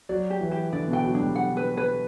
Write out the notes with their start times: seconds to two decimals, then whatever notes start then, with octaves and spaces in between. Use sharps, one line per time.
0.09 F#3 D5
0.30 G4
0.41 E3
0.51 G4
0.73 D3 D5
0.88 B2
0.93 G5
1.04 F#3
1.15 D4
1.20 G3
1.35 F#5
1.57 B4
1.77 B4